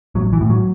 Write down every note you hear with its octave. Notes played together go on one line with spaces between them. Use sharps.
A1 F#3
E3
A2
F#3